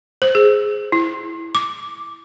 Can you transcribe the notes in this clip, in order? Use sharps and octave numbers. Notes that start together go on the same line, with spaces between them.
C5
G#4
E4
D6